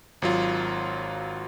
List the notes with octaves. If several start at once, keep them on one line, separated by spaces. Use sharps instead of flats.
G#1 F#3 F4